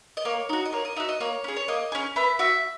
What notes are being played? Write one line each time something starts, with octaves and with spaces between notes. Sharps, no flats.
D#5
A#3 C#5
D#4 F#4
D#5
A#3 C#5
D#5
D#4 F#4 E5
D#5
A#3 C#5
C#4 G#4
C#5
A#3 D#5
C#4 G#4
B3 E5
F#4 E5